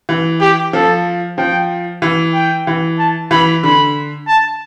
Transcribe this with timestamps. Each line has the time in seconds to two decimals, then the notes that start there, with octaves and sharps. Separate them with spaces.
0.09 E3
0.41 G4
0.73 F3 A4
1.38 F3 G5
2.02 E3
2.34 G5
2.67 E3
2.99 A5
3.31 E3 B5
3.63 D3 B5
4.28 A5